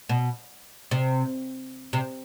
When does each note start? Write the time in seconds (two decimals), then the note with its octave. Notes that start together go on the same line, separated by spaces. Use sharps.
0.09 B2
0.91 C3
1.93 C3